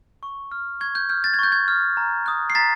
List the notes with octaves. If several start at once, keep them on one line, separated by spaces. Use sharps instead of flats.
C#6
F6
C#6 G#6
G6
F6 G6
A6
G#6
C#6 G6
G#6
F6
A#5
D#6 F#6
C7
A#5 A6 B6